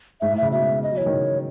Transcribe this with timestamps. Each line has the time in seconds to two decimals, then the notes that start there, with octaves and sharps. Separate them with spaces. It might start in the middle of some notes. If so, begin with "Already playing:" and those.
0.21 G#2 E5
0.32 A2
0.37 E5
0.42 C#3
0.52 B2 E5
0.83 D#5
0.92 F#3
0.97 E3 C#5
1.06 D#3
1.13 C#3